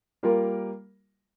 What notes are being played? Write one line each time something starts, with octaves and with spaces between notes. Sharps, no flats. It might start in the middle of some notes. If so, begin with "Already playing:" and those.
G3 A#3 F4 A#4